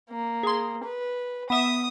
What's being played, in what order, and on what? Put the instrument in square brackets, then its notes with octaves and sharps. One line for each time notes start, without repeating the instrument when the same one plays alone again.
[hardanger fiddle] A#3
[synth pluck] G#4 C6
[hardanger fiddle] B4
[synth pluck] B3 E5 [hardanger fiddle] D#6